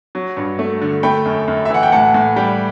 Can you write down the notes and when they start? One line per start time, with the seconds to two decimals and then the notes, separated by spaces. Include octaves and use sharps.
0.15 F#3
0.37 G2
0.59 A3
0.82 D3
1.03 A3 G5 B5
1.26 F#2
1.48 F#2
1.65 E5
1.70 E3 F#5
1.83 G5
1.92 A2 F#5 A5
2.14 A2
2.36 G3 G5 B5